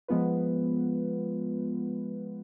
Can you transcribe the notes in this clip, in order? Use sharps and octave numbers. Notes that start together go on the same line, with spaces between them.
F3 G#3 B3 F4 B4